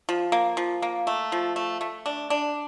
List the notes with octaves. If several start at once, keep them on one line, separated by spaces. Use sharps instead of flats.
F3
A#3
F3
A#3
A3
F3
A3
A3
D4
D4